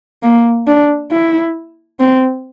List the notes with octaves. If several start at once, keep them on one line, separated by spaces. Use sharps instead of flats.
A#3
D4
E4
C4